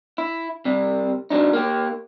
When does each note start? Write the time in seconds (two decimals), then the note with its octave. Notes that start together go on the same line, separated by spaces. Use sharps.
0.18 E4
0.65 C3 G3
1.30 F#3 D4 D#4
1.53 A#3 G4